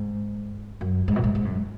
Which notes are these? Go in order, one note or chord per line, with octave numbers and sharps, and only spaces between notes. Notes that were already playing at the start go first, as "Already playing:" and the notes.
Already playing: G#2
F#2
G#2
B2
G#2
G#2
F#2